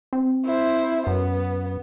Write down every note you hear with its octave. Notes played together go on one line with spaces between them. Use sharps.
C4
E4 C5
F#2 B3